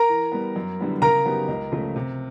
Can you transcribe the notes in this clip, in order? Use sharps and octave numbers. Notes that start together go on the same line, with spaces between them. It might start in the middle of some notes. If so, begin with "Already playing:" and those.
Already playing: A#4 A#5
E3
G3 B3
F#2
D3 G3 B3 E4
C#3 A#4 A#5
F#3 B3 D#4 G4
C#2
C#3 F3 A3
C3